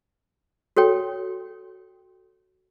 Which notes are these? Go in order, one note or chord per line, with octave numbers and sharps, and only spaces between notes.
F#4 A4 C#5 G5